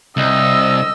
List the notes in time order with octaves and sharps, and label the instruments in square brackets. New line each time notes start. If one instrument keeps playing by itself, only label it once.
[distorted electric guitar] C2 [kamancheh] D#5 E6